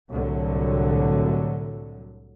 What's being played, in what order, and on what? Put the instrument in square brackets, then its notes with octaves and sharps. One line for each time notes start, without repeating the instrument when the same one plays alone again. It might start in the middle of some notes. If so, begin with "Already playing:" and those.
[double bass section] C2 A2 D3 F#3